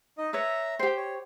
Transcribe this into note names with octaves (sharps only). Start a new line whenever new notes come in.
D#4 D#5
B4 C#5 E5 A#5 E6
G4 C5 G5
C#5